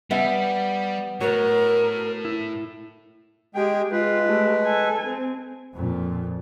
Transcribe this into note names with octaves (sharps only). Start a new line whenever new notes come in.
G3 B3 E5 G#5
A2 F#4 A#4 C#5
E4
G#3 G4 G#4 G5
G#3 F4 B4
A3 G4
A4 G#5
C4
F2 A#2